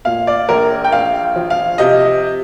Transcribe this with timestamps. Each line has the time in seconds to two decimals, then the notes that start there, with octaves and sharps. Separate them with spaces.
0.05 A#2 F5
0.27 D5
0.49 A#1 A#4
0.84 G5
0.92 A#1 F5
1.36 F3
1.50 F5
1.78 C3 D#5